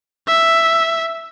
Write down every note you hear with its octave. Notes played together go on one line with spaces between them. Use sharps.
E5